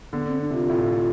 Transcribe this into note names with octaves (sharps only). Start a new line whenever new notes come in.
D3 B3
C4
D4
C3 F4
A2